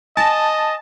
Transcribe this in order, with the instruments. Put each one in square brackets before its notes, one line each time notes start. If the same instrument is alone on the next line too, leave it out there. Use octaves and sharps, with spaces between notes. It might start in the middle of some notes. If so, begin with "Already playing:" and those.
[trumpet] D#5 [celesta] G#5 A6 A#6 [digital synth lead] A5